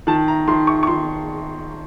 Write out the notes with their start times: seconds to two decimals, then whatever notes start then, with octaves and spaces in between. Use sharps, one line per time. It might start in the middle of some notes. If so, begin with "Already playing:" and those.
0.07 D#3 A5
0.28 A#5
0.48 D#3 C6
0.67 C#6
0.83 C#6
0.87 D#3 C6